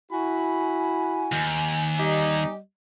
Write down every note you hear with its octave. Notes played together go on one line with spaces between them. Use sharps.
E4 F#4 G#5 B5
D#2
G3 D#4 G4 D#5